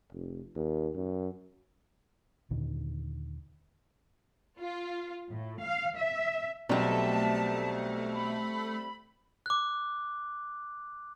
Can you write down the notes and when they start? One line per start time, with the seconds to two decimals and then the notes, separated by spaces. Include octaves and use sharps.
0.12 F1
0.55 D#2
0.95 F#2
2.51 D#2 A#2 D3 D#3
4.60 F4
5.31 A2
5.62 F5
5.98 E5
6.69 B1 B2 G3 A3 C4 E5 A5
8.13 B5
9.46 D6 F#6